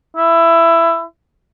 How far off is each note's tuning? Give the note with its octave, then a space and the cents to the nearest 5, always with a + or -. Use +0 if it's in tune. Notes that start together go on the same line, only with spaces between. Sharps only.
E4 +15